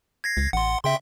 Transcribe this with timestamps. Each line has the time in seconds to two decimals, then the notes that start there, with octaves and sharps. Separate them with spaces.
0.24 G#6 A#6 C7
0.37 C#2
0.53 A1 F#5 C6
0.84 C#3 E5 G5 C6